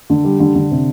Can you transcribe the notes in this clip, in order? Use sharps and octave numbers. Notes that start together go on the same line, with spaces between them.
D3
G3
D3
D3
C3